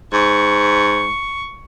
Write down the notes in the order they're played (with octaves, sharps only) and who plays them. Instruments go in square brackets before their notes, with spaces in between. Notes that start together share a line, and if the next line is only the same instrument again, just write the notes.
[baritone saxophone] G#2 [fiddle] C#6